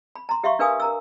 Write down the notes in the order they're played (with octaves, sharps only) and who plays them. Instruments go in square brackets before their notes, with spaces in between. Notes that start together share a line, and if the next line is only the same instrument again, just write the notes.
[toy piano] B5
A#5 C6
G4 E5 F5 C6 C#6
D4 A#4 B4 F5 G#5 D#6
A#4 A#5 E6